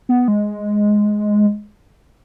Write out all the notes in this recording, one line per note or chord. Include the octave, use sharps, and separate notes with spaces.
B3
G#3